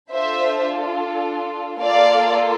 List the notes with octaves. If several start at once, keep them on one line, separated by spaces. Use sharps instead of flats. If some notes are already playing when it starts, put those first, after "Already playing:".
D4 F4 A4 C5 E5
A#3 F4 A4 D5 F5